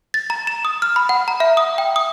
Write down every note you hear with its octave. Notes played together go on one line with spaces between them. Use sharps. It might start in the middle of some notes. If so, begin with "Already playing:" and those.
A6
A#5
E7
D#6
F6
B5
F#5
A#5
E5
D#6
G5
D#6